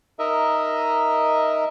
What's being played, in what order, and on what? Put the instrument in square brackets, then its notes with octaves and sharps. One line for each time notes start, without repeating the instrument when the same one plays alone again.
[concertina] D#4 A#4 D#5 E5